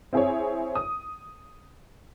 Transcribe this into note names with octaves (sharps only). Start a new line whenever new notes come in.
C4 E4 G#4 C5 C#5
D#6